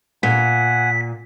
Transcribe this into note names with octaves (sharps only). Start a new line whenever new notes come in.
A#2 F#5 G#5 B6